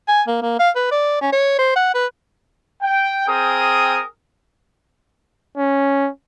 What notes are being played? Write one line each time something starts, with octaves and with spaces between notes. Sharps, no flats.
G#5
A#3
A#3
F5
B4
D5
C#4
C#5
C5
F#5
B4
G5
C4 G#4 A#4 G5 D#6
C#4